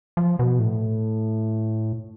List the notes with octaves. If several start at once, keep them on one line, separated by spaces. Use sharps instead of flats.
F3
B2
A2